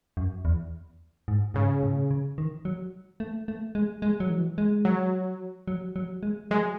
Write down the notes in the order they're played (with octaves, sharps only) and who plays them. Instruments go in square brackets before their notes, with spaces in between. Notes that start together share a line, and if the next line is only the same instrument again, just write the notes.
[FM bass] F#2
E2
G#2
[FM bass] G#2 [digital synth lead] C#3
[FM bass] A2
C#3
D#3
F#3
A3
A3
G#3
G#3
F#3
E3
G#3
[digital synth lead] F#3
[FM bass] F#3
F#3
G#3
[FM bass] F#3 [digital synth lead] G#3